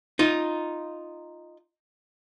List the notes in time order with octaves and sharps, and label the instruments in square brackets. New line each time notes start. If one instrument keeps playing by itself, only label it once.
[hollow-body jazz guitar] D#4 F4